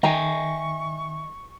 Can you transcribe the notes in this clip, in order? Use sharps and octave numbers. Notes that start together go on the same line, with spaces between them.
D#3 D#5 E5 G5 G#5 A#5 C#6